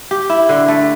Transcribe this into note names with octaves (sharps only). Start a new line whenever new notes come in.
G4
E4
D3
A3